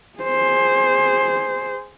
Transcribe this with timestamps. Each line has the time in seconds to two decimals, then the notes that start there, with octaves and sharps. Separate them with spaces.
0.19 G#4 C5